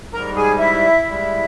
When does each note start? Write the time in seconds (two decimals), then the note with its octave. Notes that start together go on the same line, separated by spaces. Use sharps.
0.13 G#2 G3 A#4 A#5
0.36 G#4 G#5
0.59 E4 E5
1.05 G#2 G3